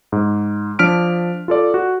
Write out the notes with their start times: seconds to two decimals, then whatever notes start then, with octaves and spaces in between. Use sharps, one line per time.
0.12 G#2
0.79 F3 D4 F6 B6 D7
1.48 F4 A4 D5
1.74 F#4